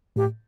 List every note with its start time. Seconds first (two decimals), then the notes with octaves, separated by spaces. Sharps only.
0.16 A2 G4